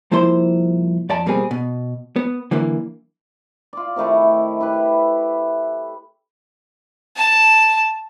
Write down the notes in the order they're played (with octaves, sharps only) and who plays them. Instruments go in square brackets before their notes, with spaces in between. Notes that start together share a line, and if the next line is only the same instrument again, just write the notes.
[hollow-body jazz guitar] C2 F3 A#3 E4 C5 C6
F2 D5 A5
B2 G3 A#3 C4 G#4
B2
B3
D3 E3 F#3 A#3
[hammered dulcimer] F4 D5
C3 D#3 A3 E4
E4 G4 B4
[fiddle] A5